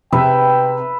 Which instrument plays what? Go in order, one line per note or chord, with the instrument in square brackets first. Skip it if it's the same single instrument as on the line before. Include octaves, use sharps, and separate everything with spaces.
[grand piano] C3 [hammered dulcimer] B4 E5 [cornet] G5